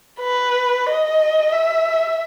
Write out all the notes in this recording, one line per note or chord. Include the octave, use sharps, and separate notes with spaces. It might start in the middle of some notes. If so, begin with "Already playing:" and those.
B4
D#5
E5